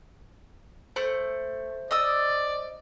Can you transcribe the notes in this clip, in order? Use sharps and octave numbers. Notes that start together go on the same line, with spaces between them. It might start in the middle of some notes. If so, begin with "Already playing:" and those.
A3 C5
D5 D#5 E6